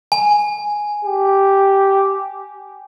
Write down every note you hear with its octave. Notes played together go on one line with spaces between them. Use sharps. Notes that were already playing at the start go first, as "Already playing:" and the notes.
G#5
G4